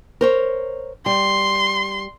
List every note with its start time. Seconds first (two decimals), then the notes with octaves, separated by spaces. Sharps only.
0.21 A#4 C5 C#5
1.06 G3 C6